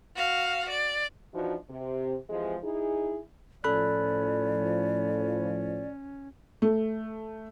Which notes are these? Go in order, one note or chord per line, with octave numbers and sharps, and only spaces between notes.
F#4 F5
D5
E3 F3 D4 D#4 F#4
C3
C3 E3 F3 G#3
D#4 E4 G#4
A2 F3 C#4 A4 D5 B5 F#6
A3